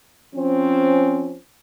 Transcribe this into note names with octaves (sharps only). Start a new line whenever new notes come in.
F3 C4 C#4